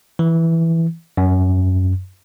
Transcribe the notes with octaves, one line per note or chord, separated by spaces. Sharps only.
E3
F#2